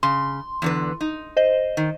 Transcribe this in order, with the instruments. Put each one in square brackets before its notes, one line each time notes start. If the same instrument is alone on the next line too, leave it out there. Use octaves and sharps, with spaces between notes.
[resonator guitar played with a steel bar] C#3 [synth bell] C6
[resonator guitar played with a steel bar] E2 D3 B4
D#4
[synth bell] C5 D#5
[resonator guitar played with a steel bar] D#3